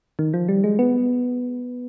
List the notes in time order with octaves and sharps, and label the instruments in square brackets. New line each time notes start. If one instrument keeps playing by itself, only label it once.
[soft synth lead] D#3
F3
G3
G#3
B3